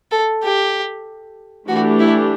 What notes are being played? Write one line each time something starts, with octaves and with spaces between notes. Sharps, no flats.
A4
G4
E3 A3 D4 F#4 G4
E4